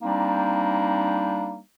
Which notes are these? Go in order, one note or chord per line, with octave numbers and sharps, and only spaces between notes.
G3 A#3 C4 D4 D#4